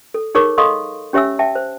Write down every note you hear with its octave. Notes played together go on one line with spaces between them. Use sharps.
A4
D#4 G#4 A#4 C#5 C#6 D6
A4 D#5 F5 C6 C#6 D#6
C#4 G4 C#5 E5 G#5 E6
E5 G5 A5
C5